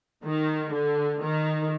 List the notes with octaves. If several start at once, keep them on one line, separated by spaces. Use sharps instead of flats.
D#3
D3
D#3